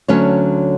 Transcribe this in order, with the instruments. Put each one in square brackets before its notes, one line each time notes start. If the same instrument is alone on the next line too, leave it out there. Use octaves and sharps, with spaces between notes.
[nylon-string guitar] D2 D3 F#3 C#4 C#5